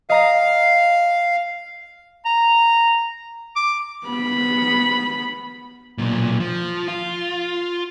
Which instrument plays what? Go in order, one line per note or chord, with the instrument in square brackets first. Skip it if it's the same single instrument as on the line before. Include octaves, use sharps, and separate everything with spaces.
[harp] D#5 A#5 A#6 [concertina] F5
[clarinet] A#5
D6
[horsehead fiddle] B3 B5
[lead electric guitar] B1 A#2
F3
F4